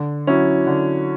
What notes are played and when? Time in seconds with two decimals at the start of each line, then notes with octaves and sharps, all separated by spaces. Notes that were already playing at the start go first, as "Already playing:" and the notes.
Already playing: D3
0.27 F#3 C#4 E4
0.67 D3